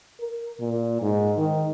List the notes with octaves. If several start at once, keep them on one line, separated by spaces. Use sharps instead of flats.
A#4
A#2
G#2
D#3